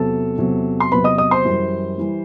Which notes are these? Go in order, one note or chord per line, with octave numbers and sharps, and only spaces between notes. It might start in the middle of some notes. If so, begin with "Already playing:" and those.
Already playing: E2 C3 F#3 A4 A5
E2 C3 F#3
C6
E2 C3 F#3 B4 B5
D#5 D#6
D#5 D#6
C5 C6
F#2 E3 G3
E3 G3